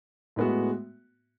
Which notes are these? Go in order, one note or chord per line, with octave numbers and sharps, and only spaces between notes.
A2 G#3 B3 F#4